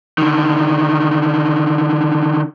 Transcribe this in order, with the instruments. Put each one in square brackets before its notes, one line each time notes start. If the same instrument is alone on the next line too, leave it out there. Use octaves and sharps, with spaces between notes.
[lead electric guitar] D3 D#3